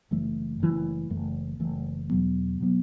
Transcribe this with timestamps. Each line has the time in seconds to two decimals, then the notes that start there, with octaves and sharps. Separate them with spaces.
0.11 F#1 F#2 E3 A3
0.60 F#1 F#2 E3 A3
1.10 F#1 F#2 E3 A3
1.60 F#1 F#2 E3 A3
2.09 E2 B2 F#3 B3
2.60 B2 F#3 B3